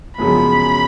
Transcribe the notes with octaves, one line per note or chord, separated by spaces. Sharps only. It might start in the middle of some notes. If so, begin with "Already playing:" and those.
F#2 C#3 F3 G#3 B3 B5